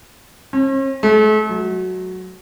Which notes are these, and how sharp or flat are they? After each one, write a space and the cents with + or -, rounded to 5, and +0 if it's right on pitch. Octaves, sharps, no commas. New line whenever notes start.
C#4 -45
A3 -40
F#3 +0